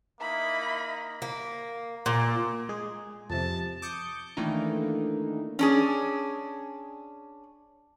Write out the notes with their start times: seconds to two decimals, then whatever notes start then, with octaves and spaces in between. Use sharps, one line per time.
0.21 A#3 D#4 E4 D#5 B5
1.22 A#3
2.06 A#2
2.69 G#3 G#4
3.30 F2 C3 A5
3.82 D6 D#6 G6 C#7
4.37 D#3 E3 A3 A#3 D4 D#4
5.59 C#4 D4 G#4